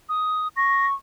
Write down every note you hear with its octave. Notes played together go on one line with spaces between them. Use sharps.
D#6
C#6 A#6